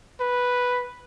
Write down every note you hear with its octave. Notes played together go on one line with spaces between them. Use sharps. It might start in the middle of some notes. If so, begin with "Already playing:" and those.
B4